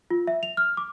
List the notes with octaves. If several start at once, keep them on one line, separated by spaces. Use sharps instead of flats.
F4
E5
F7
F6
D6